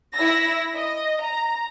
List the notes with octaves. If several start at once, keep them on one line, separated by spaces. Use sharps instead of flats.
E4 E6 A#6
D#5
A#5